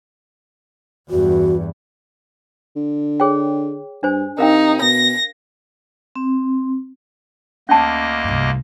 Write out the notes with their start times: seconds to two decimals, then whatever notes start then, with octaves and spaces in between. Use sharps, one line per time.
1.10 E2 G2 F#4
2.76 D3
3.20 G#4 C#5 G5
4.03 G2 D4 C5 G#5
4.38 C3 D#4 A#4 F5 G5
4.82 B2 A#6
6.16 C4
7.69 D2 A#3 C#4 D#5 A5
8.24 C2 G2